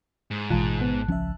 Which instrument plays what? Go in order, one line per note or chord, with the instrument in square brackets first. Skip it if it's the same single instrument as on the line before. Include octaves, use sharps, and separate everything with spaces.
[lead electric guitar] G#2
[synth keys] A1 A5 F#6 [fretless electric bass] B2 E3 G#3 [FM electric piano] F4
[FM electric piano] B3
[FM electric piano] C#2 E5 [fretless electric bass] F3 C#4